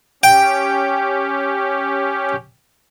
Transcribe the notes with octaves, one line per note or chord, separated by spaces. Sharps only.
C#4 G4 G5